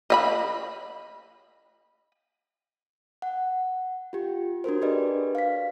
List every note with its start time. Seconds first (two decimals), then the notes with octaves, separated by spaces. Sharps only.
0.10 D#5 E5 B5
3.22 F#5
4.13 F4 G4
4.64 D4 F#4 A#4 C5
4.81 D4 G4 G#4 B4 D5 D#5
5.35 F5 B6